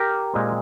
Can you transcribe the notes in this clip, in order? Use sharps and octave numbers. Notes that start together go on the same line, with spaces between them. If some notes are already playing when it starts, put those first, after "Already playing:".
Already playing: G4 A#4
A#2 G#3 C4